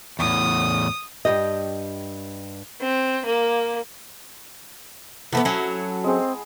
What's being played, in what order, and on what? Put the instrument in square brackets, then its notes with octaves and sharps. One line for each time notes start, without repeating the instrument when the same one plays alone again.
[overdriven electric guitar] E2 A2 [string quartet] D#6
[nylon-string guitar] G2 D#3 G4 D#5
[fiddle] C4
A#3
[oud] E3 A3 B3 [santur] A4 F#5 B5
[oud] F#3 C#4
[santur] G#3 G#4 [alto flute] C4